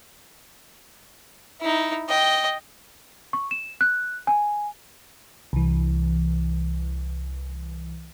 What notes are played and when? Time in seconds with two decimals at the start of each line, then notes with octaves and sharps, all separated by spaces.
1.61 D#4 E4
2.08 D#5 G5
3.33 C#6
3.51 E7
3.81 F#6
4.27 G#5
5.53 C2 E3